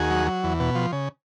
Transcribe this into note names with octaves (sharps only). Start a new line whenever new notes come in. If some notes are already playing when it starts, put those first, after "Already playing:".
Already playing: D#2 F#4 G#4
F#3
F#3
E2
B2
F3
C#3